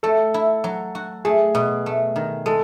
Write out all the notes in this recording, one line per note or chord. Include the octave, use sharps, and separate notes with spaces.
A3 A4
E4
F#3
F#4
A3 G#4
B2
A3
D#3
G#3 A4